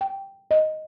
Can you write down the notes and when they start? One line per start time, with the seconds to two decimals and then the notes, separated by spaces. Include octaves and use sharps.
0.01 G5
0.51 D#5